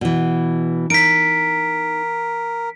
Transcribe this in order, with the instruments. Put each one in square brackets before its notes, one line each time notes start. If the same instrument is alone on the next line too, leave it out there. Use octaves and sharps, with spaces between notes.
[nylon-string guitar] B2 E3
[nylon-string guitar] D#4 [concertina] A#4 [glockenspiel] B6 D7